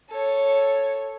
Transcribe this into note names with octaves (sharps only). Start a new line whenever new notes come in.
A4 C#5